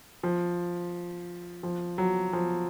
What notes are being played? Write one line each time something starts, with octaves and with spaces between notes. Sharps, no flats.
F3
F3
F#3
F3